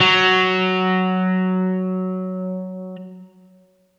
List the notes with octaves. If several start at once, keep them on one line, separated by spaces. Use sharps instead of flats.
F#3